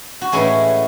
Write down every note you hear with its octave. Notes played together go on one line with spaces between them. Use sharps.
F#4
A2 E3 G#3 C#4 E4